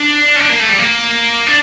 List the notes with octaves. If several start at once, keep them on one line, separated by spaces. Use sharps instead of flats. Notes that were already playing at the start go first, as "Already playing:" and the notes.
Already playing: D4
C#4
D4
A#3
A3
G3
A#3
D4